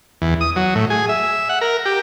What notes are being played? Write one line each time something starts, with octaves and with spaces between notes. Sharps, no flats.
E2
D#6
F#3
A2
G#4
E5
F#5
A#4
G4